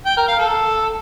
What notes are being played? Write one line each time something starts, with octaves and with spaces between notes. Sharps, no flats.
G5
A#4
F5
A4